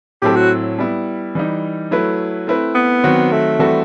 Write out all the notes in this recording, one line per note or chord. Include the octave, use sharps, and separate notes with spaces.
A2 F#3 C4 E4 G4 A4
F#4
G3 B3 E4
E3 G3 D#4
F#3 A3 E4 B4
A3 C4 E4 B4
B3
D#3 F#3 C4 F#4
A3
E3 G3 C4 F#4 A4